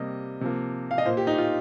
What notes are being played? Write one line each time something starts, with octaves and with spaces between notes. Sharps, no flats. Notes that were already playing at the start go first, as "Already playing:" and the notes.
Already playing: C3 G3 A#3 D#5
C3 F3 A#3
F5
D#5
A#2 A#3 C5
G4
D#4
F4